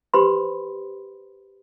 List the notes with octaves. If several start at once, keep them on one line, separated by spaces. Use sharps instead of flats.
G4 B4 C5 B5 C6